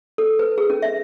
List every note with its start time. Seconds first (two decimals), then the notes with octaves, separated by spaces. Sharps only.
0.18 A4
0.39 B4
0.58 G#4
0.70 C#4
0.82 E5